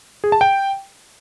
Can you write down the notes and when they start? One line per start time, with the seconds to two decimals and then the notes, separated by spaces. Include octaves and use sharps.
0.24 G#4
0.32 A5
0.41 G5